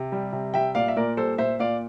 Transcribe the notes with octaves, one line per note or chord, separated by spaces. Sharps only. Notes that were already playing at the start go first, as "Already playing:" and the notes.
Already playing: C3
G3
C3
G3 E5 G5
A#2 D5 F5
E5
A#2 A#4 D5
G3 A4 C5
A#2 C5 E5
A#2 D5 F5